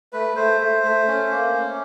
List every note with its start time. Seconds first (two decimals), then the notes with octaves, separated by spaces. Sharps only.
0.13 A3 B4
0.36 A3 C5
0.60 A3
0.83 A3
1.08 C#4
1.31 A#3
1.54 C#4